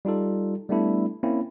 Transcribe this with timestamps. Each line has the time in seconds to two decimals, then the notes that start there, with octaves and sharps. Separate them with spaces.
0.05 G3 D#4 F4 A4
0.69 G3 A3 B3 D4 E4 A4
1.23 A#3 C4 C#4 E4